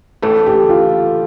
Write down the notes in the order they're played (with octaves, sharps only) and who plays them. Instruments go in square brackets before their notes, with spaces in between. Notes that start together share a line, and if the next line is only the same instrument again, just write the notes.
[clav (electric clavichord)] A1 A2 E3 A3 [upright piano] A4
[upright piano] G4
F4